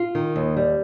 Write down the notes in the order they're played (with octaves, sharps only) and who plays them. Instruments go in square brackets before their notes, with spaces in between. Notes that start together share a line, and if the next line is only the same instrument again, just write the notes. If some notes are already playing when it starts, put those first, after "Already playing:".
Already playing: [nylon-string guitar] F4
D#3
D#2
G3